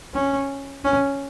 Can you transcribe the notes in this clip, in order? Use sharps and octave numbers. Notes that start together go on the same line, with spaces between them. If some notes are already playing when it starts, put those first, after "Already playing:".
C#4
C#4